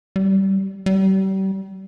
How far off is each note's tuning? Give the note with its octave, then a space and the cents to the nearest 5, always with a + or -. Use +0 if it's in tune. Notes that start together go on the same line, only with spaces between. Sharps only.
G3 -20
G3 -35